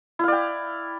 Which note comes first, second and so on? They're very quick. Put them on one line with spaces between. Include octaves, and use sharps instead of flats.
E4 F5 D5 G5